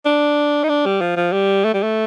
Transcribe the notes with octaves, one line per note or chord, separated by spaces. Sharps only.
D4
D#4
D4
G3
F3
F3
G3
A3
G3
A3